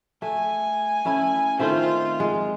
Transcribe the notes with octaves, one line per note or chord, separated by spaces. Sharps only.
A3 G#5
A3 C#4 E4
D#3 A3 C4 F4
G#3